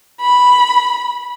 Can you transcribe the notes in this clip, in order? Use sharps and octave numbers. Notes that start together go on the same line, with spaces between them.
B5